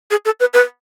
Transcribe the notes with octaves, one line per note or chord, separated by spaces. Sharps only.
G#4
A4
B4
B4